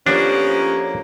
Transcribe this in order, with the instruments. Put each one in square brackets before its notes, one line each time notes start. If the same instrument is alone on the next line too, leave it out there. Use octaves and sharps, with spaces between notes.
[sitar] F2 A#3 [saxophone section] F3 B3 C#4 [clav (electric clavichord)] D4 [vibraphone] G4